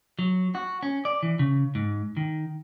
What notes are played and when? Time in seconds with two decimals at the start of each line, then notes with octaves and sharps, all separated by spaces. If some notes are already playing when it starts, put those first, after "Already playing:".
0.19 F#3
0.55 F#4
0.83 C#4
1.05 D5
1.23 E3
1.39 C#3
1.75 G#2
2.17 D#3